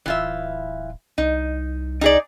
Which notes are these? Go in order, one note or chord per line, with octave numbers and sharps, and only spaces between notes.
D1 E3 F4 E5
C2 D#4
D#4 G#4 D5